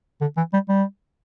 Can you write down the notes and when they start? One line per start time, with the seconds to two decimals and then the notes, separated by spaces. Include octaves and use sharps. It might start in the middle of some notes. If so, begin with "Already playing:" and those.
0.21 D3
0.37 E3
0.53 G3
0.68 G3